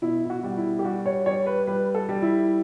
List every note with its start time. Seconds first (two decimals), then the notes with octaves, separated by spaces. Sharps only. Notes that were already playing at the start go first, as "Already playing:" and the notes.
0.02 B2 E4
0.25 E4
0.30 F#4
0.43 G3
0.57 E4
0.79 G4
0.84 G3 F#4
1.06 C#5
1.26 G3 C#5
1.46 B4
1.67 G3 B4
1.95 A4
2.09 G3
2.22 E4